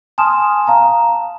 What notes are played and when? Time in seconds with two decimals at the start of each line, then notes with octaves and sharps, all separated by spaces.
0.18 G#5 A5 C6 D#6 F6 E7
0.67 F5 A5 A#5